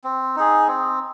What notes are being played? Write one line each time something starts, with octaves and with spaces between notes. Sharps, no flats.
C4
D#4 G#4
C4